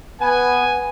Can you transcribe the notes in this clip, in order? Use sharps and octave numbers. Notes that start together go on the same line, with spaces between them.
B3 B4 F#5 G#5